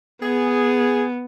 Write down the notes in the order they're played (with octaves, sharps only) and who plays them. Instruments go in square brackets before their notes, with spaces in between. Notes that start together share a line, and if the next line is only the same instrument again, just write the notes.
[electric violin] B3 [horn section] G#4